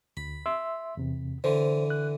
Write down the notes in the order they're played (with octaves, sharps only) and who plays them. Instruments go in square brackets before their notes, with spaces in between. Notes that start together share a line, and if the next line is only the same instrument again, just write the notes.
[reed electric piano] D2 [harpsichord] B5
[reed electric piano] E5 C6 E6
E2 C3
[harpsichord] D3 E3 [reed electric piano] C5
[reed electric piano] F#6